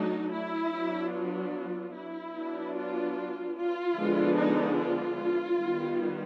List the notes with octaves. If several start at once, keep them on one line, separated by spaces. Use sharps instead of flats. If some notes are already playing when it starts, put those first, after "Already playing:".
Already playing: F#3 A3 D4 D#4
E4
F#3 B3 D4
F4
E4
F#3 B3 D4
F4
F4
D3 F3 G#3 B3 D4
D#4
F4
D#3 G3 B3